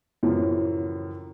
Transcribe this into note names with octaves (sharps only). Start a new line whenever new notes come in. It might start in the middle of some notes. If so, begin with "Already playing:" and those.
F#2 A2 C#3 E3 F3